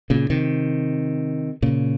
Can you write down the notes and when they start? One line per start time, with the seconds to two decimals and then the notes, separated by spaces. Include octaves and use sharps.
0.10 A#2 C#3
0.30 C3 D#3
1.62 A#2 C#3